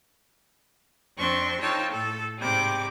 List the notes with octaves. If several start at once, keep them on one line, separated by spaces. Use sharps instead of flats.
F2 C4 D4 C6 C#6
D#4 F4 A4 C#5 G5 A5
A2 A4
G#2 C3 G3 D6